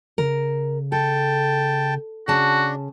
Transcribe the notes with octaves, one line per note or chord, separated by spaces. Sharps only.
C#3 A#4
A4 G5 A5
C#3 D4 F#4 A5